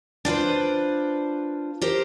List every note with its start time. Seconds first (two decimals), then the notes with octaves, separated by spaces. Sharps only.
0.25 D4 F4 B4 C5
1.82 G4 A#4 C5